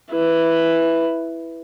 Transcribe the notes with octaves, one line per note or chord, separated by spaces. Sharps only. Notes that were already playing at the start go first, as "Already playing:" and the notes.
E4 B4